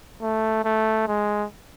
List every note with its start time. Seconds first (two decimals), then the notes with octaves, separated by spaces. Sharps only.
0.22 A3
0.65 A3
1.08 G#3